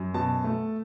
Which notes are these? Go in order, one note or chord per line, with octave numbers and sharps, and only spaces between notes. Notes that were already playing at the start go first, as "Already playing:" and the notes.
Already playing: F#2
B2 A5
A3